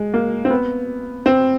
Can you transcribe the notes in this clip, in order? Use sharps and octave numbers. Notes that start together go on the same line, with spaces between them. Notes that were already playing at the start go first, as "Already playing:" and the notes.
Already playing: G#3
A#3
C4
B3
C4